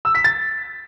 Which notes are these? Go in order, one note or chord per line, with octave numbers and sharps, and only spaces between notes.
E6
B6
A6